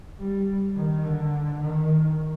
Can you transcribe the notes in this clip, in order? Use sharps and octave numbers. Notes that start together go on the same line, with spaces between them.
G3
D#3
D3
D#3